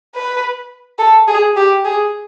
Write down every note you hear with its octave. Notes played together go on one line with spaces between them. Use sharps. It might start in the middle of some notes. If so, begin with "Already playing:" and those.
B4
A4
G#4
G4
G#4